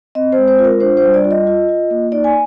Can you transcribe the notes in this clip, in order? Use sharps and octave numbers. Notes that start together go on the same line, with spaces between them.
C4 D#5
G#3 C5
C5
F4
A#4
D4 C5
C5
G3
D5
F4
D#5
F4
F4
A#3
D#4 D5
G#5